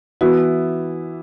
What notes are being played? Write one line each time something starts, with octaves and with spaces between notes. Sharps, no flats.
E3 B3 E4 F#4